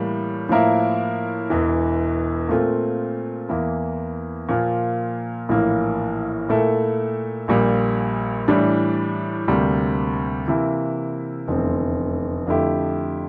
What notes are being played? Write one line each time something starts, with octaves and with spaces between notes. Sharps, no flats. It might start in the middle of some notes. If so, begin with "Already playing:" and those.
Already playing: A2 E3 G3 A#3
A2 F3 A#3 E4 A#4
E1 E2 E3
A#2 A3 C4 F4
E2 E3 A#3 E4
A#2 F3 A#3 F4
A#1 A2 E3 A#3
A#2 A3 E4 A4
A#1 A#2 G3
A2 E3 G3 D4
D2 C3 G3 A#3
C3 E3 A#3 E4
F1 E2 D3 A3 C4
F2 D3 A3 E4 G4